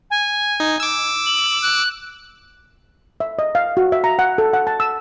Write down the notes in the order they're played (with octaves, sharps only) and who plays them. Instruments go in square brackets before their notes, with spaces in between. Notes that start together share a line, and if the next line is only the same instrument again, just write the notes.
[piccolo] G#5
[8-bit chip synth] D#4
D6 E6
[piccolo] F#7
F#6
[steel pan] E5
D#5
F5
F#4
E5
A#5
F#5
A4
F#5
A5
E6